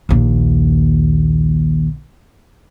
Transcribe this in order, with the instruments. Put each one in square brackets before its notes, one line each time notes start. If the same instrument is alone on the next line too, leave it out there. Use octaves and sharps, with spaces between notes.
[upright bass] A#1 D#2